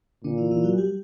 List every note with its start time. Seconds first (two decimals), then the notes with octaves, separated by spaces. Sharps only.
0.24 A#2 D3 D4
0.38 E3 E4
0.51 E3 E4
0.64 F#3 F#4
0.78 G3 G4